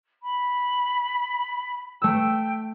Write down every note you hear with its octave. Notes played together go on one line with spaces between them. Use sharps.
B5
A3 G5 E6